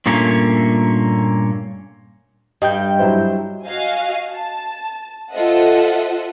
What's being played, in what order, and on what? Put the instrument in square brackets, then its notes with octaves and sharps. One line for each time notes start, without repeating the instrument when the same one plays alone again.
[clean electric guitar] G2 A#2 A3 A#3 C#4
[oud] G2 [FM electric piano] D#5 G5 G6
[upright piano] F#3 E4 C5
[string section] F#4 D#5 F5 G#5
A5
F4 A4 C5 D#5 E5 F#5